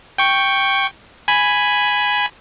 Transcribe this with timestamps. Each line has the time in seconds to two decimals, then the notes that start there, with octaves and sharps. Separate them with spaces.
0.18 G5 C#6
1.28 G#5 B5